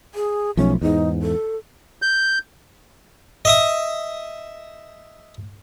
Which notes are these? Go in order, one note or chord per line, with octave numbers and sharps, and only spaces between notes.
G#4
B1 F3 A3 C#4
E2 G#2 D#4
A4
G6
D#5 E5 D#6